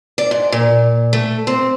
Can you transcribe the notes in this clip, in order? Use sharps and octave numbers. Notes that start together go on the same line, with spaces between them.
D5
G#2
A#2
A3
C4